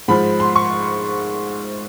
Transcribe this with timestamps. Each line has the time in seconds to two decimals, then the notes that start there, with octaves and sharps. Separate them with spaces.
0.08 G#2 F3 B5
0.40 C6
0.56 C#6